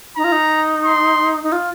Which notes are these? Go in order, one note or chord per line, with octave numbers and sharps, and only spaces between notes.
D#4 A#5
F4
D#4
C6
D#4
F4